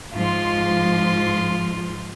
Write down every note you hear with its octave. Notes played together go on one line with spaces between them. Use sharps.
G#2 F3 F4 C6